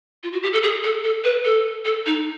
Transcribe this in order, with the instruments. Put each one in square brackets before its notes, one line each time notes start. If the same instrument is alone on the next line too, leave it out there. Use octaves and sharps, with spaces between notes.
[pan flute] F4
F#4
G4
A4
G#4
A4
A4
B4
A4
A4
D#4